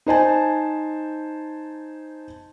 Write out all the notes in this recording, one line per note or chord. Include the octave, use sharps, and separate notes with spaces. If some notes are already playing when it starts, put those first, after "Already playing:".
D#4 C5 G#5 A5